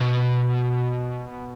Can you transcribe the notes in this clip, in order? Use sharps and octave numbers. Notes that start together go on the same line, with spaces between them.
B2